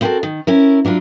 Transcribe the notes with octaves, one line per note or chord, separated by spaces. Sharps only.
C4 E4 F#4 G4 A4 A#4
D#3
C#4 E4 A#4
F#3 D4 E4 F4